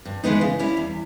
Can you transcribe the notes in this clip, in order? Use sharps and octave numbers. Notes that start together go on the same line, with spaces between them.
G2
E3 G#3 B3 D#4
C#3
G3 C#4 E4
E2